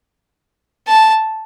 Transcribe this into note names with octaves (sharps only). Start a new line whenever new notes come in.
A5